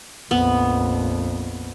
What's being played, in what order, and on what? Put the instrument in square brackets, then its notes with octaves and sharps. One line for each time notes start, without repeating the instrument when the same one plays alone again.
[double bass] A#1 F2 [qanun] B3